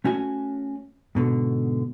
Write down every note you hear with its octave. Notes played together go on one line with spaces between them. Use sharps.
A3 C#4 F#4 G#5
G#2 B2 D3